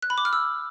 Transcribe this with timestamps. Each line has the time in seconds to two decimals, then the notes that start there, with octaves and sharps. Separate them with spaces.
0.03 F#6
0.10 B5
0.18 D6
0.25 F6
0.33 E6